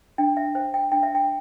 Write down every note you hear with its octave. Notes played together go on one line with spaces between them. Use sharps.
D4 G5
E5
C5 G5
G5
D4 G5
E5
G5